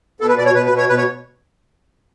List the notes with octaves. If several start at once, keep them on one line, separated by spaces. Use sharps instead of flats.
B2 A4
B4
B2 D5
C#5
B2 B4
B4
B2
C#5
B2 B4
C#5